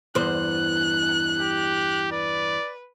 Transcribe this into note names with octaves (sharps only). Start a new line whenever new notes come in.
E2 G2 C5 F#6
G4
B4 D5